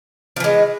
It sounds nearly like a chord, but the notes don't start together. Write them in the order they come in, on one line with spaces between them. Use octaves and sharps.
F3 E3 G#3